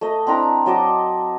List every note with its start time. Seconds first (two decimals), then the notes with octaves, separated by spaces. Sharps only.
0.01 A3 D#5
0.27 C4 D4 E4 A#5
0.66 F#3 D#5 A5 D6